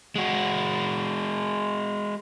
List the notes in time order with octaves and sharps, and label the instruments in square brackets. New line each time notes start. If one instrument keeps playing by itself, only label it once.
[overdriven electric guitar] G#3 F#4